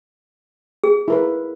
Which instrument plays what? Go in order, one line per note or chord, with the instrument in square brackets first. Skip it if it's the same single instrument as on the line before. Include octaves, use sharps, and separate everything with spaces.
[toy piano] G#4
[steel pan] E4 A#4 B4